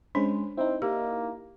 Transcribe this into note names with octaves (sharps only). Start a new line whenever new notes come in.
G#3 C#4 D4 C5
C4 D#4 E4
A#3 G4